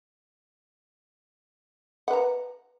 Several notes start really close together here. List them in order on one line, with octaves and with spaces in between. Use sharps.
F#5 B4 A#5